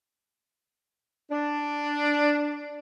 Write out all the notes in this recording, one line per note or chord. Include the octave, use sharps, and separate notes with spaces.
D4